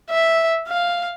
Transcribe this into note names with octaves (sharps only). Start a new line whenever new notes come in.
E5
F5